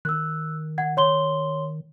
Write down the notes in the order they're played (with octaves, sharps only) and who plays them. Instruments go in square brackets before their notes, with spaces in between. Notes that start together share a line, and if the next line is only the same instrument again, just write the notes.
[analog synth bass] D#3 [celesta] E6 F#6
[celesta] F#5 G#6
C#5 C6 G7